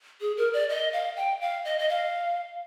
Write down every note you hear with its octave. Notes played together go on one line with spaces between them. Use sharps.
G#4
A#4
D5
D#5
F5
G5
F5
D#5
D#5
F5